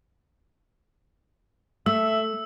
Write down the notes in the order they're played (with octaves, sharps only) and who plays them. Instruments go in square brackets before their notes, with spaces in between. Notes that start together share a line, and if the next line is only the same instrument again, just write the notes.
[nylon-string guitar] A3 [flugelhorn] E5 [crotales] E6